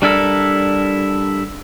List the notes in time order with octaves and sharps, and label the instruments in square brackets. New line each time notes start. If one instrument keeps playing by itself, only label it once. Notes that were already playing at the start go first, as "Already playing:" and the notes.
[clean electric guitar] G3 D4 E4 A4 A#4